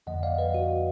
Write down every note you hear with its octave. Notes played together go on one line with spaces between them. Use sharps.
F2 D3 F3 A#3 D#5 F#5
D5 F5
B4 D#5
F#4